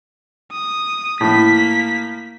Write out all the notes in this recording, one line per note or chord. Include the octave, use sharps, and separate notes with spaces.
D#6
A2 A#3 B6